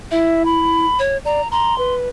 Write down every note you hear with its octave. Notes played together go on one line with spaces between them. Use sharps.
E4 E5
B5
C#5
D5 A#5
A#5 C6
B4